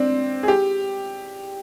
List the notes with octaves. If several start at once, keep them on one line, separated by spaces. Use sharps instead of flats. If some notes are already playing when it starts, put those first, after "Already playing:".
Already playing: C4 D4
G#4
G4